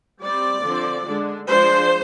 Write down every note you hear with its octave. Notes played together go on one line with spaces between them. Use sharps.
G3 C4 D5
D3 F3 C4
D3 G#3 D4
F3 G#3 D4 C5